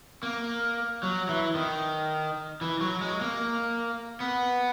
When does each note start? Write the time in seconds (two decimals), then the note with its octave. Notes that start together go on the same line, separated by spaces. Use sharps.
0.23 A#3
1.03 F#3
1.29 E3
1.55 D#3
2.61 E3
2.81 F#3
3.01 G#3
3.21 A#3
4.20 B3